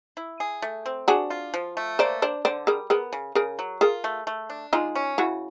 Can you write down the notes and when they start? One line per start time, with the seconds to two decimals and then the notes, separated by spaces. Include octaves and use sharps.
0.17 E4
0.40 G#4
0.62 A3
0.86 C4
1.08 D4 F#4 G#4
1.30 F4
1.54 F3
1.77 A3
1.99 A#3 C5 D5
2.22 D4 C5 D5
2.45 D3 C5 D5
2.67 G3 G#4 A#4
2.90 B3 G#4 A#4
3.13 C#3
3.35 C#3 G#4 A#4
3.59 F#3
3.81 F4 G#4 A#4
4.04 A3
4.27 A3
4.50 D4
4.73 G#3 D#4 F4
4.95 C#4
5.18 C#3 E4 F#4